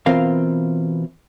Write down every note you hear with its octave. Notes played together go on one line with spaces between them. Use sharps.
B2 E3 C4 F4 A#4 F5